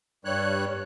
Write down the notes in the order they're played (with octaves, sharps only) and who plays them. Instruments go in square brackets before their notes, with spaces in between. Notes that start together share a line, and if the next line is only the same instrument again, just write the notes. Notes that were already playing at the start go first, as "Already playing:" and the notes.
[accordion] G2 G3 C#5 F#6